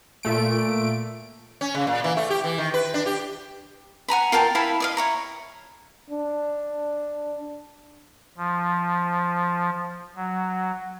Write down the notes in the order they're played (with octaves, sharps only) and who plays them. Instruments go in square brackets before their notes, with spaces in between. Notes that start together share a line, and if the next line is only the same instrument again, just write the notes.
[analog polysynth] A#2 A3 D7
[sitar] C#4
C#3
A#2
E3
A3
G4
E3
D#3
B4
D4
G4
[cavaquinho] F#5 G#5 A#5 B5
F4 A#4 G5 A5
E4 F5 A5 B5
D5 D#5 F5
E4 C#5 A#5
[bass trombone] D4
[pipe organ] F3
F#3